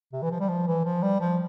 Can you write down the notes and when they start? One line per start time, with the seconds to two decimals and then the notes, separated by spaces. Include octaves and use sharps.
0.13 C3
0.23 E3
0.31 F3
0.40 G3
0.49 F3
0.67 E3
0.85 F3
1.03 G3
1.20 F3